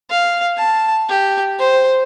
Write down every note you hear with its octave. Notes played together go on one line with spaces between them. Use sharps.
F5
A5
G4
C5